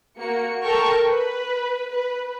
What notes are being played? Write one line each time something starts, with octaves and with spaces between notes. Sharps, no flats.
A#3 F#4 C#7
A4 A#4 G5 A5 C#6
B4
B4